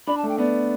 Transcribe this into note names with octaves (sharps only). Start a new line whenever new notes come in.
D4 B5
A5
A3
G5
B3 D5